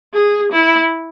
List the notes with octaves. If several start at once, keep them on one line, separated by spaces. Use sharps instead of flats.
G#4
E4